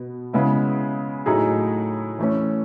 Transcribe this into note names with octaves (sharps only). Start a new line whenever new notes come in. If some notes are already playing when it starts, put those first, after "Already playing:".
Already playing: B2 B3
C#3 G#3 B3 E4
A2 F#3 A3 D#4 G#4
E3 A3 C#4